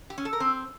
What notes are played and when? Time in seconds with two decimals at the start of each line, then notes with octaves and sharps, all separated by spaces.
0.10 G4
0.18 C#4
0.25 A4
0.33 A#4
0.40 C4